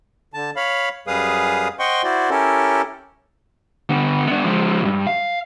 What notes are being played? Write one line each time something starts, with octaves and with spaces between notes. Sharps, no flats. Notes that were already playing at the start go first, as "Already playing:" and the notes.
D3 A5
C#5 F5 B5
F#2 G3 G#4 B4 F5 D#6
C5 D#5 F#5 G5 C6 C#6
E4 F#4 C5 D5
C#4 E4 G4 A4 A#4
D3 B3
B3 D4
F3 G#3
C2 G2
F5